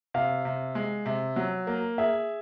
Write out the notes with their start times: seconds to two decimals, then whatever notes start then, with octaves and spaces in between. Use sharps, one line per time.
0.14 C3 F5
0.45 C3
0.75 G#3
1.06 C3
1.36 F#3
1.67 A#3
1.98 G#4 E5